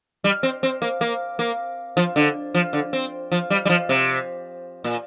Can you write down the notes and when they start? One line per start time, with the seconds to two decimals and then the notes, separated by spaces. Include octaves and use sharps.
0.24 G3
0.43 C4
0.63 C4
0.82 A#3
1.01 A#3
1.39 A#3
1.97 F3
2.16 D3
2.54 F3
2.73 D3
2.93 C4
3.32 F3
3.50 G3
3.65 G3
3.69 F3
3.89 C3
4.84 A#2